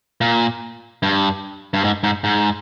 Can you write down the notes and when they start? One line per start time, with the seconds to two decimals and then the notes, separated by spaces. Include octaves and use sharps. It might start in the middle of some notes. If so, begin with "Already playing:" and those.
0.21 A#2
1.03 G2
1.74 G2
1.84 G#2
2.04 G#2
2.24 G#2